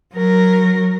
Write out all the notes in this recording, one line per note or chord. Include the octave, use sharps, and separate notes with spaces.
F#3 A#4